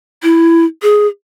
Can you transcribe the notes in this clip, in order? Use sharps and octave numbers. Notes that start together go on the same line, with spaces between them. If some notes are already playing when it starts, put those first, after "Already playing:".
E4
G#4